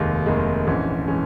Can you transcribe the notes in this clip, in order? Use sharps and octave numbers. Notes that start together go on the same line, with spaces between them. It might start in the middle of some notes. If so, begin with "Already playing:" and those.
Already playing: F1 D#2 D#3 G#3
F1 D#2 D#3 G#3
A#1 G#2 E3 G#3 C#4
E3 G#3 C#4